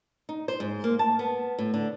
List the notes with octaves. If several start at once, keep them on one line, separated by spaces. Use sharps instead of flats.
D#4
C5
G#2
A#3
A5
B3
A2
D3